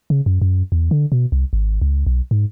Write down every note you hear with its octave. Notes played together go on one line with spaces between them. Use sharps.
C#3
F#2
F#2
E2
D3
B2
C2
G#1
C#2
B1
G#2